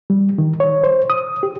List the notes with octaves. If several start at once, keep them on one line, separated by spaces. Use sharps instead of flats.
G3
D#3
C#5
C5
D#6
G4